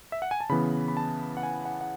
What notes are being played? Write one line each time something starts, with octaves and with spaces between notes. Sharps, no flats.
E5
F#5
G#5
A5
C#3 E3 B3 B5
B5
A5
F#5
G#5
F#5
F#5